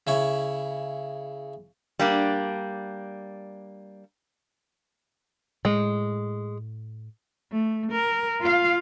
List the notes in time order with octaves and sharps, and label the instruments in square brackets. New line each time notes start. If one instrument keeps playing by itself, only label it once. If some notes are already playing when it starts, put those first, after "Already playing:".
[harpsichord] C#3 E4 C#5
[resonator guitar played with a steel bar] G3 A#3 D4
[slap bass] A2 [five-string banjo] G#3
[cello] A3
A#4
F4 F5